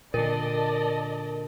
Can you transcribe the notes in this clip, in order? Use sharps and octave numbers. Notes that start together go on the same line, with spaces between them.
A#2 D3 A#4 D5 D#5 A5